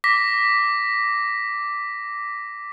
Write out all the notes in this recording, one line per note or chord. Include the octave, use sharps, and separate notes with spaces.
D6 A#6 B6